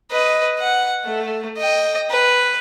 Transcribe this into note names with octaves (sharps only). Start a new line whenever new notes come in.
B4 D#5
F#5
A3
D#5 G5
B4